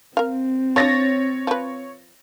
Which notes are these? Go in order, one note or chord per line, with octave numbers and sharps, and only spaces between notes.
C4 A#4 F5
F3 D4 C#5 A6 A#6
F3 B4